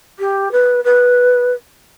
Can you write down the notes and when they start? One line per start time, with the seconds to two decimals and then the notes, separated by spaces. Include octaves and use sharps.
0.19 G4
0.51 B4
0.84 B4